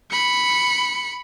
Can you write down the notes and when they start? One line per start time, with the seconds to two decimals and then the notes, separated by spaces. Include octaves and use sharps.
0.11 B5 C#7